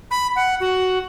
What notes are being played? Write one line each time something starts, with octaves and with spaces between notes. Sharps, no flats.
B5
F#5
F#4